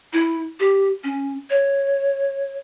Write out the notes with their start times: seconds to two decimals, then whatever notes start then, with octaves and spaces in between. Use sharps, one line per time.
0.13 E4
0.60 G4
1.04 C#4
1.50 C#5